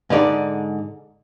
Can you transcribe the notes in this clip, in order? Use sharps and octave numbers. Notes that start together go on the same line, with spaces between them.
G#2 D3 D#4 D5